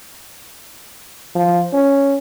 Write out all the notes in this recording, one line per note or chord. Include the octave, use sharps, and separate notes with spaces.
F3
C#4